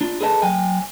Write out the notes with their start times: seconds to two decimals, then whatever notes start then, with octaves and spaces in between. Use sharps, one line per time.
0.01 D4 F4
0.21 G#4 A4 B4 D#5 A5
0.42 F#3 G5 G#5